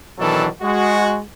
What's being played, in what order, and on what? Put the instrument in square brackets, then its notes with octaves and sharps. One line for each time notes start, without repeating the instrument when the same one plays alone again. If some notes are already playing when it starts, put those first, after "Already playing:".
[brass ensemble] B2 D#3 E3 F#3 D4 A4
G#3 F#4